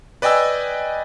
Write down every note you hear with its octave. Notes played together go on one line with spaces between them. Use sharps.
B4 D5 D#5 G5 G#5 E6